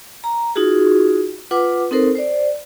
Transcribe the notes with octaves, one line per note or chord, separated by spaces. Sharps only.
A#5
D#4 F4 F#4 G#4
F4 B4 F#5 D6
C4 D#4 A4 A#4 C5
C5 D5